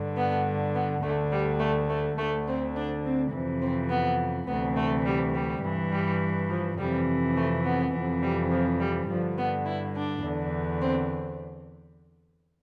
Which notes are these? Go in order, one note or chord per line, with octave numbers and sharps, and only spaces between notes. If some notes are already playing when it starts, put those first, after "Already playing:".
Already playing: G2 D3
B3
B3
D2 D3 A3
G3
A3
A3
D2 D3 A3
C4
D4
C4
F2 C3 E3
C4
B3
D2 C3 E3 B3
A3
G3
G3
G2 E3
G3
F3
F2 C3 E3 G3
A3
B3
F2 C3 E3
G3
F3
G3
G2 D3 F3
B3
E4
D4
E2 D3
C4